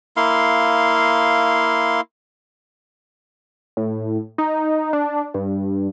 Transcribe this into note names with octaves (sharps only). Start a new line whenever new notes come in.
A#3 E4 F5 C6
A2
D#4
D4
G2